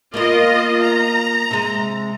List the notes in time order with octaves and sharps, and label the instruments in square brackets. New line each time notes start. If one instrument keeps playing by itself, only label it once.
[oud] A#3 B3 A#4 [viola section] F4 D#5
[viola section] A#5
[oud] C3 G#3